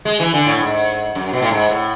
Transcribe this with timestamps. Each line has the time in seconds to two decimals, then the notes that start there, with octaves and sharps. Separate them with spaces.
0.05 G#3
0.20 E3
0.33 D3
0.46 A2
0.60 G#2
1.15 F#2
1.33 B2
1.42 A2
1.51 G#2
1.69 A2